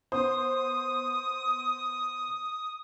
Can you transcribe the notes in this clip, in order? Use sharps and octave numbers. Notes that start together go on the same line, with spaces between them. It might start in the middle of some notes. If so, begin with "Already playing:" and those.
B3 C5 D#6